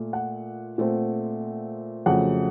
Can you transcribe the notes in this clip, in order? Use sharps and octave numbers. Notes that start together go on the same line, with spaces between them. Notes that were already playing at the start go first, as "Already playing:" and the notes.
Already playing: A#2 A3
F#5
A#2 A3 C4
F2 C#3 F#3 A3 F#5